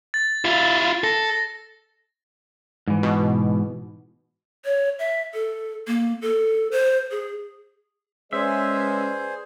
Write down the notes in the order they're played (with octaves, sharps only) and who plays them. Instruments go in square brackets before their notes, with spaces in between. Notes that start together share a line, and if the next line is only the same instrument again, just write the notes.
[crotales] A6
[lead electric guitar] E4 F4
[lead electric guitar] A4 [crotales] A#6
[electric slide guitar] G#2 E3
[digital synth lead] B2
[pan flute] C#5
E5
A4
A#3
A4
C5
G#4
[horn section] G#3 C#4 [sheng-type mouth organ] G#4 C5 [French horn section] B4 D5 [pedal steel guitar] E5